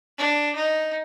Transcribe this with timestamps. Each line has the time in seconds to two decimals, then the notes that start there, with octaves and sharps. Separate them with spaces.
0.18 D4
0.55 D#4